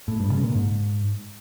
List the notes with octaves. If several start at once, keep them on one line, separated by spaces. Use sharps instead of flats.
A2
G2
C#3
A#2
G#2